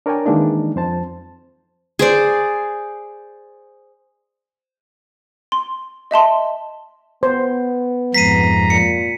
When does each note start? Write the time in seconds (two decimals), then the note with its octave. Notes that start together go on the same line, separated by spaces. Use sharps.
0.06 D4 A#4 C#5 D5 G5 G#5
0.26 D#3 E3 G#3 A#3 D4 D#4
0.76 F2 C5 A5
1.99 G#4 C5 D5
5.52 C6
6.11 D#5 E5 A5 C6
7.23 B3 C5
8.14 F2 G#2 A#5 B6 C7 D#7
8.70 A#2 C#7